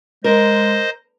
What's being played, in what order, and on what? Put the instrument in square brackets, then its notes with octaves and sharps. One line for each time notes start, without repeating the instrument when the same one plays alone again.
[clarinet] G#3 [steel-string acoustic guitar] A#4 [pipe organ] C5 D#5